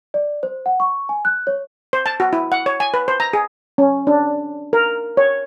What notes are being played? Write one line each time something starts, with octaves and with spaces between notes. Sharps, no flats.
D5
C5
F#5
C#6
G#5
F#6
C#5
C5
A5
F#4
E4
F#5
C#5
G#5
B4
C5
A#5
G#4
C#4
D4
A#4
C#5